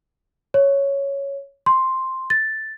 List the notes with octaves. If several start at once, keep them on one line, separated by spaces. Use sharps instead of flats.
C#5
C6
A6